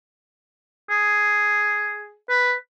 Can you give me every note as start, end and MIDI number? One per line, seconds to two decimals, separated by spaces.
0.90 2.16 68
2.30 2.54 71